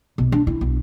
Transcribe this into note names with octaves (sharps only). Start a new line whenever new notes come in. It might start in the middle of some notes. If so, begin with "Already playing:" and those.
B1
D4
E4
B1